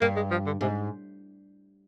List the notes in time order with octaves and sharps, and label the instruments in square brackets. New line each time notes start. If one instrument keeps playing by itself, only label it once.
[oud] G2 [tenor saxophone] A#3
[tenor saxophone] G#3
F3
D3
[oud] G#2 [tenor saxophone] C3